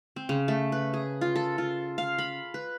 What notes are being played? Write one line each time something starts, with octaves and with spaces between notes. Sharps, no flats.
C4
C#3
A3
B4
G#4
F4
A4
F4
F5
B5
B4